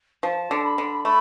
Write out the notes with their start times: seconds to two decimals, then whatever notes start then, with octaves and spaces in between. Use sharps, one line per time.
0.23 F3 A5
0.51 D3
0.65 B5
0.78 D3
1.05 A3 B5